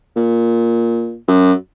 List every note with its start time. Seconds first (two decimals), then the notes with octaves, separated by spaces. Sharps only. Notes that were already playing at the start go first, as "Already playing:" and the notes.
0.16 A#2
1.28 F#2